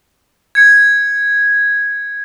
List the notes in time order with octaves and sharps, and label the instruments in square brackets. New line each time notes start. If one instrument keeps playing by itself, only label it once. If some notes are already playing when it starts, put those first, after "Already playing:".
[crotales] G#6 C#7